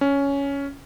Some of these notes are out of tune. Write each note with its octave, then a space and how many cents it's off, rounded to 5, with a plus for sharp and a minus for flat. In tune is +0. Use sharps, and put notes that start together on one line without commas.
C#4 +10